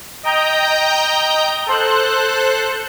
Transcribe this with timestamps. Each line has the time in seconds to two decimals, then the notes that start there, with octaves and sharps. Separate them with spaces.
0.23 D#5 G5 A#5 G6
1.66 A4 C5 F#6